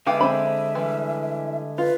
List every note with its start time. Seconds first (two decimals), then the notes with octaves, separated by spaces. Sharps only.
0.07 D3 G#3 B3 E5 F5 G5 D6
0.21 C4 C5 B5
0.75 E3 G3
1.78 F4 B4